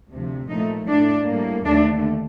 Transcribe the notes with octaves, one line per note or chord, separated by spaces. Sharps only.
D2 C3 F3
A#2 F3 A3 D#4
A2 A3 D4
A2 G3 A#3
D#2 D3 A3 D4